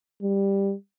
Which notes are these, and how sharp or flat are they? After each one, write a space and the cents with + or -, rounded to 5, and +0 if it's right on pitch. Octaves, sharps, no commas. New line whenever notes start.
G3 +10